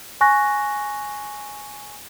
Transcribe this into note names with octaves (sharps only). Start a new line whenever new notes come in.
G#5 C#6 F#6 A#6